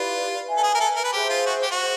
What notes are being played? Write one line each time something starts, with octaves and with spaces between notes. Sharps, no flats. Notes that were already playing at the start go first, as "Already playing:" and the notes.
Already playing: E4 F4 G4 B4 D5
B4 E5 G#5
A4
G#4
A#4
A4
A#4
B4
G4 G#4 C5 E5
F4
F#4
G4
F#4
G#4 C5